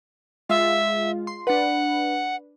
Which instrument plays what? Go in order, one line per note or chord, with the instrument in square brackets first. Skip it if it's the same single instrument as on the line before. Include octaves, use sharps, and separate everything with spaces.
[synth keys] G#3 F4 [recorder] E5
[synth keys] C6
[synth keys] D4 B4 [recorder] F#5